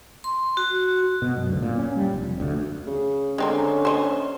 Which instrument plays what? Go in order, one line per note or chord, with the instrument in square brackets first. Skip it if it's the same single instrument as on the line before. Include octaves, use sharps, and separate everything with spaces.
[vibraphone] C6
F#4
[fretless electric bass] B2
F#2
D2
A#2
C#4
G3
F1
F2
D2
[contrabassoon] C#3
[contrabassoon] D3 [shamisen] G#3 C4 A#4 [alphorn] C#4
[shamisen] C5 C#5 D#5